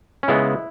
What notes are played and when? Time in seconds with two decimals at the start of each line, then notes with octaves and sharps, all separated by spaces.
0.23 C#4
0.28 C#3 G#3 B3 E4